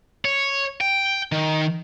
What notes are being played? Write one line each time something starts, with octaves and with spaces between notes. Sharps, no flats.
C#5
G5
D#3